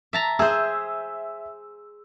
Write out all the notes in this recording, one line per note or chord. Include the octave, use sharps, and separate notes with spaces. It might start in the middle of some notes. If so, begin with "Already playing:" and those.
E5 A5 A#5
G#4 C5 E5 E6